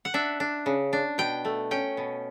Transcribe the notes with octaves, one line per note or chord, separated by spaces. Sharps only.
F#5
D4 E5
D4
C#3
D4
B2 G5
A3
C#4 G5
B2